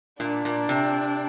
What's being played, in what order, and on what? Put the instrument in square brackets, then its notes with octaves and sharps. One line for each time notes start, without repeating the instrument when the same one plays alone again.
[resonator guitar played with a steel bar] A#2 [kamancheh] D4
[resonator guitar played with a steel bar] A#2
C3